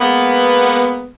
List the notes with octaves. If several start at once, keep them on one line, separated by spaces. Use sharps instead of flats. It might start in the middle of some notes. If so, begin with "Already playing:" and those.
G#3 A#3 B3